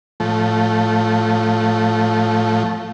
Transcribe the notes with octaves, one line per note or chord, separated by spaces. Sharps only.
A2 F3 A3